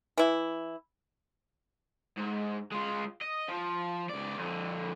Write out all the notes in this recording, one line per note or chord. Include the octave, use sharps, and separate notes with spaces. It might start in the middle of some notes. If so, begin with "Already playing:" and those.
E3 E4
G#2
G#3 F4
D#5
F3 F4
C#2 D5
F2 D3